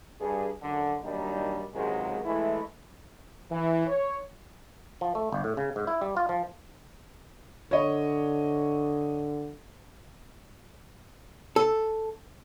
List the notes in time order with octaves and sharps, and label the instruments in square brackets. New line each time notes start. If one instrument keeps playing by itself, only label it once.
[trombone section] G2 G#4
F#2 D3
D#3 F#3 G3 A#3 D4 D#4
C#2 C3 D#3 F#3 G#3
E3 G#3 A3 E4
[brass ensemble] E3
C#5
[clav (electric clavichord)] F3
A3
G1
A2
C#3
G#2
E4
G3
F4
F3
[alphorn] D3 [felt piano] C#5 D#5
[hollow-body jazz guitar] A4